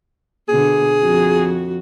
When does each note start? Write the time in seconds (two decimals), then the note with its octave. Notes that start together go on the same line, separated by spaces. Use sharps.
0.49 B2 D3 G#4
1.01 F2 F#4